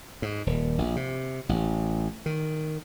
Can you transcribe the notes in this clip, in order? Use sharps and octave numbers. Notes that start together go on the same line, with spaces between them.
G#2
D#1
A#1
C3
A1
D#3